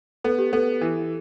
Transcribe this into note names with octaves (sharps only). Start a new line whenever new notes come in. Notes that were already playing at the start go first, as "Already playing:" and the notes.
B3 A4
G4
B3 A4
E3